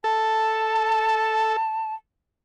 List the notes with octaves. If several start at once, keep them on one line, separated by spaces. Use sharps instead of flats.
A4 A5